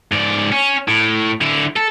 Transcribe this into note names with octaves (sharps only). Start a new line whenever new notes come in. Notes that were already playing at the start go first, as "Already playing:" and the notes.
G#2 D5
C#4
A2
D3 E4
A4